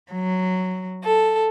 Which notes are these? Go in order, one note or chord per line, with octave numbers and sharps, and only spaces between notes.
F#3
A4